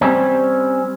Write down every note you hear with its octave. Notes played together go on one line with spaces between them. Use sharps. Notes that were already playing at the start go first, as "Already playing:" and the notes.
G3 C4 C#4